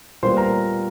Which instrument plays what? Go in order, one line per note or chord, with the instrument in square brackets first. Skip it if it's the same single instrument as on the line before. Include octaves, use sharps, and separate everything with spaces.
[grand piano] A#2 G3 B3 C5 C6
A#4 A#5